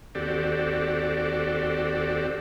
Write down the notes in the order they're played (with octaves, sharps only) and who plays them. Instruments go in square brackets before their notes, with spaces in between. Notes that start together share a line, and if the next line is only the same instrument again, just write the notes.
[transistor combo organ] D#2 C4 F#4 G4 A4 D5